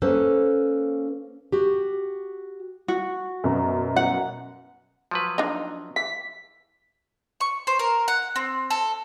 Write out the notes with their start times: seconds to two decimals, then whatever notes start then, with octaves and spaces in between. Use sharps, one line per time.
0.02 A#3 C#4 A4 B4 C5
1.52 F#4 G4
2.88 F#4
3.44 F#2 B2 A#5
3.96 F#5
5.11 F3 F#3 B4
5.38 D4 D#4
5.96 E3 B6
7.41 C#6
7.67 C5
7.79 A#4
8.08 F#5
8.36 C4
8.70 A4